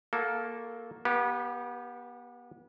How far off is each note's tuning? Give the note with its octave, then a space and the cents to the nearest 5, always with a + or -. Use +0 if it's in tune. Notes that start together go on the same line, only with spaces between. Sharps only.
A#3 +0 F#4 -20 A4 -15
B3 -35 G4 +0 B4 +0